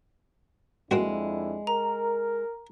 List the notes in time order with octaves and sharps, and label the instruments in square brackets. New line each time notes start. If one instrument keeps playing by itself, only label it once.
[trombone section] F2 D4 E4 [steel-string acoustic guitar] G#3 [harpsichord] A#3 C4 F#4
[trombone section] A#4 [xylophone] A#5